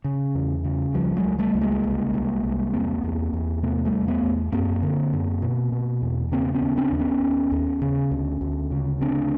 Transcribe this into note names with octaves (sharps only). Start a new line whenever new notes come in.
C#3
E2
C#3
C#2 F3 G3
F#3 G#3
C#2
G3 A3
C#2
G#3 A#3
C2
C2
C2
E2 A#3 C4
E2
E2
C3 A3 B3
G3 A3
E2
A3 B3
E2
F#2 A#3 C4
D3
F#2
B2
B2
E2
C#3 A#3 C4
B3 C#4
D#2
C4 D4
D#2
B3 C#4
D#2
D#2
C#3
D2
D2
C#3
D2 C4 D4